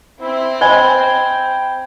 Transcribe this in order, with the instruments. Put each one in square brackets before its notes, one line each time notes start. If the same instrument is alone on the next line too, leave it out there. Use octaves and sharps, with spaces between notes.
[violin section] C4 [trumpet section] E4
[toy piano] C5 D#5 G#5 [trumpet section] G5 [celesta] B5 G#6 G7